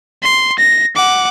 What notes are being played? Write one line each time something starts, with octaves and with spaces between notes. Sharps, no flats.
C6
A#6
F#5 D6